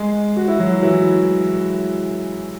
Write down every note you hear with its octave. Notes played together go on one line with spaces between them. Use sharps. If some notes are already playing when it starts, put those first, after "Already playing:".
Already playing: G#3 G#4
F#4
E4
F#3 F#4
E3 E4